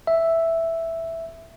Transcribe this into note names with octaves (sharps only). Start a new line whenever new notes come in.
E5